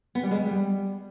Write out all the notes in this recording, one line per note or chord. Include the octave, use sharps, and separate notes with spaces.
B3
G3
G#3
B3
G3